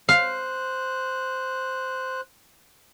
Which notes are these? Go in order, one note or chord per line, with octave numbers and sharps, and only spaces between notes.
C5 F5 F#6